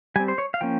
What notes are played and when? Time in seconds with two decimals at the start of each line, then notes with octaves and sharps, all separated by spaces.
0.16 G3 G#5
0.20 C4
0.28 C5
0.38 C#5
0.54 F5
0.61 F3 A#3 C#4 G5